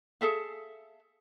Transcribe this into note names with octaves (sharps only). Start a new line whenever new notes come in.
G#4 A4 E5 F5